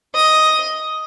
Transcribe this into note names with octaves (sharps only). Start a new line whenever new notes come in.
D#5